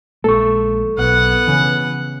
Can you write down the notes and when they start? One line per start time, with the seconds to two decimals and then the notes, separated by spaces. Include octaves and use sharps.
0.24 A#1 G#3 A#3 A4 C#6
0.98 B1 B3 F#5
1.47 C#3 E3 G6